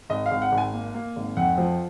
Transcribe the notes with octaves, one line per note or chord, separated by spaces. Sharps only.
G#1 D#5
F5
G#1
F#5
G#1
G#5
A#3
A#3
G#1
F2 F#5
F3